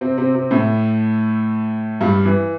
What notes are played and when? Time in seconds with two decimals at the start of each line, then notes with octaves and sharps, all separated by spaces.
0.01 C3 C4
0.18 C3 C4
0.35 C3 C4
0.51 A2 A3
2.01 G2 G3
2.25 E3